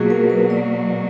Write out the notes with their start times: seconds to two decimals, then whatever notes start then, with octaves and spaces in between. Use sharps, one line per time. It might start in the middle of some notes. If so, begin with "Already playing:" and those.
Already playing: B2 F#3 A#3 F4 F#4 G#4
0.10 A#4
0.30 B4
0.50 D5